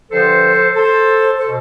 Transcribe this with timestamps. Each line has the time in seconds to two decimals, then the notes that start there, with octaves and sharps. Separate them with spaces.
0.11 G2 D3 F3 A4 C5
0.75 A4 C5
1.38 B2 A4 C5